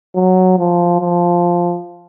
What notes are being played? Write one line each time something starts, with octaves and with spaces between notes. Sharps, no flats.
F#3
F3
F3